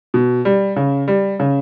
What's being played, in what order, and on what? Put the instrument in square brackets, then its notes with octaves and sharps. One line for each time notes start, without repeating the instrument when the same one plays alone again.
[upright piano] B2
G3
C#3
G3
C#3